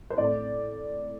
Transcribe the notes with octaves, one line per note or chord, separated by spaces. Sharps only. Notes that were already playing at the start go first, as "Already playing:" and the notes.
C5
A2 D5